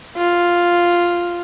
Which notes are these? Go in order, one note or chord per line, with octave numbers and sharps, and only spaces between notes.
F4